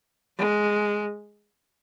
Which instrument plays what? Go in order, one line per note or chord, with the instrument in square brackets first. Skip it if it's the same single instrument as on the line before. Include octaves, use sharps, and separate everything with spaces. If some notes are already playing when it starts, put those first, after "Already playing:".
[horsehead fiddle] G#3